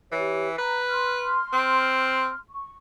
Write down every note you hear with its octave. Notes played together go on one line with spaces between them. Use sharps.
E3 G4 C#5
B4 A#5
C6 F6
C4
C#6